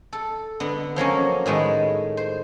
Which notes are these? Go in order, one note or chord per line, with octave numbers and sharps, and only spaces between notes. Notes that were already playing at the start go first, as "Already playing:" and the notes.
A4
D3 B3
F3 F#3 A#3 C#4
A2 D#3 G#3 B4
C5